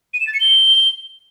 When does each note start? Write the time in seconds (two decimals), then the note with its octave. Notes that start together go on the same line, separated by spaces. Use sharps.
0.14 D#7
0.20 E7
0.27 A6
0.34 C#7
0.41 G7